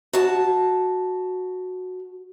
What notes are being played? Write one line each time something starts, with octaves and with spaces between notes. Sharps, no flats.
F#4 A5